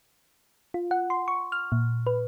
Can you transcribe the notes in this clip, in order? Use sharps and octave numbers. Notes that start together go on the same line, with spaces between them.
F4
F#5
C6
C#6
F6
A#2
B4